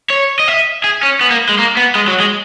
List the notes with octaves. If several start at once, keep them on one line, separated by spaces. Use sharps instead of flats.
C#5
D#5
E5
G#4
C#4
B3
A#3
G#3
A#3
B3
G#3
F#3
G#3